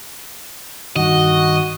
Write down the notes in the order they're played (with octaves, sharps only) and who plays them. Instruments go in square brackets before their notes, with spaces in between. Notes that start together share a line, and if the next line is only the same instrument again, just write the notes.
[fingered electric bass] G2 D#3 [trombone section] F#4 [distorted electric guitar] D#5